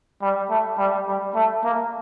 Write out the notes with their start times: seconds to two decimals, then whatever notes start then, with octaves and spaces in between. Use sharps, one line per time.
0.22 G3
0.50 A3
0.78 G3
1.07 G3
1.35 A3
1.63 A#3